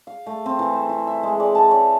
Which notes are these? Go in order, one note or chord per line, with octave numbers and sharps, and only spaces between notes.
F5
A3
C4
E3
C5
E4
E5
G#3
D5
A5
C#5